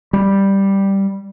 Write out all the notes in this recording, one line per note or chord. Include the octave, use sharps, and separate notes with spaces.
G3